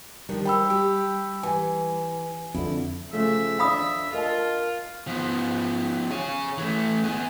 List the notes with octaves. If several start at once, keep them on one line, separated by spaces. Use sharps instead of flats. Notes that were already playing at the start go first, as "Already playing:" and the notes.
D#3 F3 G3 D4
C5 G5 B5 E6
G4
E3 G#5
F2 D3 E4
C#3 F3 A3 E5
F2 D4 F5 B5 D#6
F4 A#4 D#5 A5
F3 B3
G#4 C#5
E3 A3
B3 G#4